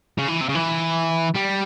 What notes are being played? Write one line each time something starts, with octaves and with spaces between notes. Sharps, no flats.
C#3
E3
C3
C#3
E3
G3